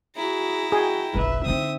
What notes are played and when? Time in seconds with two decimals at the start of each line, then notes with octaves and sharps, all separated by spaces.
0.16 E4 F#4 G#4 A#5
0.72 F#4 G#4 G5
1.14 F#1 B1 B4 E5
1.45 D3 C4 D#4 E5 D#6